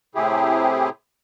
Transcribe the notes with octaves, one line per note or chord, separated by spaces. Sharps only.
A2 C3 E4 G4 G#4